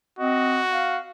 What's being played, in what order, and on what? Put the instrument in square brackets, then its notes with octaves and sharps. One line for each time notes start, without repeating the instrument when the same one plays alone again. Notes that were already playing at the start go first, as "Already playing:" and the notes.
[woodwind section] C4 D#5 [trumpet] F#4
[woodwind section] F5